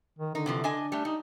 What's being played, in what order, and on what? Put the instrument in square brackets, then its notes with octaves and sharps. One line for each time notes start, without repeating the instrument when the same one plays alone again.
[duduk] D#3
[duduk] D3 [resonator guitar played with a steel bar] D#4
[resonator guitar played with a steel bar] C3 E3 F3
D4 D#5 G#5
[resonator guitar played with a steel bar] G3 A3 [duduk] D4
[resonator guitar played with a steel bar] G3 [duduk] D#4